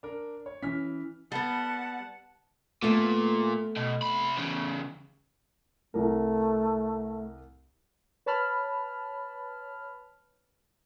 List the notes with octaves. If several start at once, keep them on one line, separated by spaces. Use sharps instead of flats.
D4 A#4
C#5
E3 C#4 F6 B6
G3 B3 F#5 A5
A#2 A3 B3
B2
C2 B5
E2 C#3
C2 A3 A#4
B4 C#5 A5 B5 F6